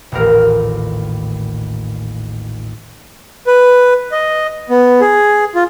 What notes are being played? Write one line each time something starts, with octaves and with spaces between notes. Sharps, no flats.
D#1 A1 A#4
B4
D#5
B3
G#4
F4